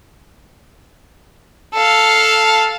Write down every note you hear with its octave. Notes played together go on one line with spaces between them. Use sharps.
A4 F5